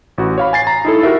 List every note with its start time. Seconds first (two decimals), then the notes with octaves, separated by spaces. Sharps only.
0.18 A1 F#4
0.38 C#5 F5 B5
0.53 G#5 A6 C7
0.67 A#5
0.85 D#4 E4 A4
1.03 F#4 G4 A#4 E5